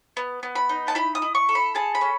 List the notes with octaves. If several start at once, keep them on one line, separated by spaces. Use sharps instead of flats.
B3
B3
B5
D#4
A5
E4 B5
D#6
E4
C#6
A4
B5
G#4 A5
B5
C#4